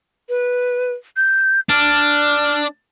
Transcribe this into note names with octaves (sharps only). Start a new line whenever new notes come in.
B4
G6
D4 F6